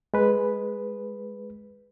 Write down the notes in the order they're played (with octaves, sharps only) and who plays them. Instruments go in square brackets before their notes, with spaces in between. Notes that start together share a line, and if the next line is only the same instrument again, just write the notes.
[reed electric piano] G#3 B4